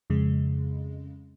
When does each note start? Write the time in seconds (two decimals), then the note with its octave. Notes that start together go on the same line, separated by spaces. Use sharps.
0.10 F2 C#3 G#3